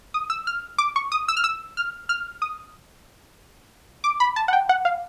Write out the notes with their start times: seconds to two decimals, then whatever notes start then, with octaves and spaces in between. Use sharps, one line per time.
0.14 D#6
0.30 E6
0.47 F6
0.78 D6
0.96 C#6
1.12 D#6
1.28 E6
1.37 F6
1.44 E6
1.77 F6
2.09 F6
2.42 D#6
4.04 D6
4.20 B5
4.36 A5
4.48 F#5
4.53 G5
4.69 F#5
4.85 F5